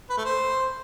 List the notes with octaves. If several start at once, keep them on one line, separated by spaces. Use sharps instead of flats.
B4
A3
C5